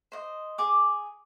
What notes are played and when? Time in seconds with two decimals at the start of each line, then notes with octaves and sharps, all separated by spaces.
0.12 C5 D#5
0.58 G#4 D6